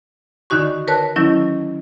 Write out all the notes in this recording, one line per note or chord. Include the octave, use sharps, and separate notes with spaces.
D3 D#3 D#4 F#4 C#6
A#4 B4 C#5 A5 F#6
D#3 F#3 C#4 E4